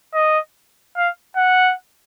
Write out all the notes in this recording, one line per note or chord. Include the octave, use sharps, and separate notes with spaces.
D#5
F5
F#5